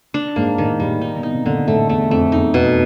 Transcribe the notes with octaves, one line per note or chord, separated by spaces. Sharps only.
D4
G#2 A#3
A2 D#3
A#2 G3
D#4
B2
D#4
C3
A#2 D3
A2 A3
E2 A3
F2 A3
E2 D#4
E2
B2